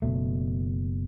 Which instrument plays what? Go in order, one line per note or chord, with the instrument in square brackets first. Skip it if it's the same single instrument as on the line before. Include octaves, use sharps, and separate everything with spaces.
[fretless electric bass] F#1 B2 A3